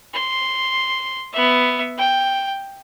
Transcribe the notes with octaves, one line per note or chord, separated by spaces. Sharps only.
C6
B3 E5
G5